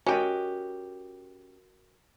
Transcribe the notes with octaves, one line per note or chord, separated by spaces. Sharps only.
C#4 F#4 G4 A#4 D#5